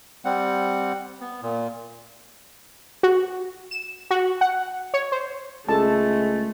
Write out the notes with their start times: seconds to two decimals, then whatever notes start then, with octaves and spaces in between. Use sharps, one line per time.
0.25 G3 C4 F#5
1.21 B3
1.42 A#2
3.03 F#4
3.71 E7
4.11 F#4
4.41 F#5
4.94 C#5
5.12 C5
5.69 C#2 G#3 A3 A4 A5